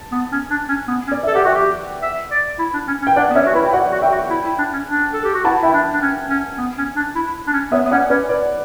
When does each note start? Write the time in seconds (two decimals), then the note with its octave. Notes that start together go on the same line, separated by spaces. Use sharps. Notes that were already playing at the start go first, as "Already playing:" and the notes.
Already playing: A5
0.12 B3
0.32 C#4
0.50 D4
0.69 C#4
0.88 B3
1.07 C#4
1.12 D5
1.23 A4 E5
1.35 G4 F#5
1.45 F#4 E5 G5
1.54 G4
2.02 E5
2.31 D5
2.59 E4
2.74 D4
2.88 C#4
3.02 C#4
3.07 G5
3.16 D4 D5 F#5
3.30 B3
3.35 C#4 C#5 E5
3.46 F#4
3.54 E4 B4
3.65 G5
3.73 F#4 D5 F#5
3.92 F#4
4.02 E5 G5
4.12 F#4
4.30 E4
4.45 E4
4.58 D4
4.73 C#4
4.88 D4
5.13 A4
5.24 G4
5.34 F#4
5.44 E4 F#5 A5
5.61 E4 E5 G5
5.73 D4
5.93 D4
6.01 C#4
6.30 C#4
6.58 B3
6.78 C#4
6.96 D4
7.15 E4
7.47 D4
7.53 C#4
7.72 B3 C#5 E5
7.85 B3
7.91 C#4 D5 F#5
8.10 C#4 B4 D5
8.29 B4 D5